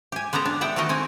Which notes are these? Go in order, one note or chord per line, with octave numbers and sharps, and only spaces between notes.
G4 G#5
G#3 B3 G4 A4 A#5
D4
B3 E5 F#5 G5
D#3 A3 F#4 A#4 D#5
C4 G#5